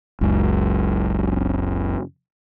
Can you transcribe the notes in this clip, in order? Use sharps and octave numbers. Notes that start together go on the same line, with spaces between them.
F#1 C#2 F#2